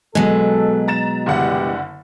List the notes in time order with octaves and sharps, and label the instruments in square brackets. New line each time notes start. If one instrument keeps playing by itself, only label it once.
[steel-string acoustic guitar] B2 F#3 [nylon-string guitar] G#3 [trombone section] A4
[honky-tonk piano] A#5 A6 E7
[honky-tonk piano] F#1 D3 F#5 [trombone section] E3 G3 G4